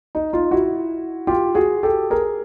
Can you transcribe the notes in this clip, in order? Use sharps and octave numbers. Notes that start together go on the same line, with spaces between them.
D#4
D#4 F4
E4 F#4
F4 G4
F#4 G#4
G4 A4
G#4 A#4